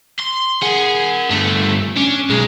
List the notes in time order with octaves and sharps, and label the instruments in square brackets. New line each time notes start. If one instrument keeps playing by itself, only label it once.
[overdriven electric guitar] C6
[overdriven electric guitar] G#4 G#5 [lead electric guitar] A#4 F#5
[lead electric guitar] G2 D3 [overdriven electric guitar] A3
[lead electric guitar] C#4 [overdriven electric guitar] D4
[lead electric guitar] B1 [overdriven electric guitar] G#3